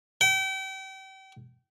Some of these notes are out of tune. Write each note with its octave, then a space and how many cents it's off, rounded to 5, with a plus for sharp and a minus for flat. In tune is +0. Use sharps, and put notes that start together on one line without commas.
G5 -35